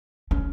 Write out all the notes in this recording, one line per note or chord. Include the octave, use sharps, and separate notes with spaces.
C#4